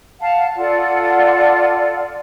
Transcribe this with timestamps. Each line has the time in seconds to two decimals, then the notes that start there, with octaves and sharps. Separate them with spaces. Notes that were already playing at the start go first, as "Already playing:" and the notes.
0.20 F5 F#5 A5
0.55 F4 A4 D5 F#5